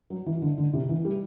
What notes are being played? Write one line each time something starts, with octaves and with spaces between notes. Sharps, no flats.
F#3
E3
D3
D3
C3
E3
G3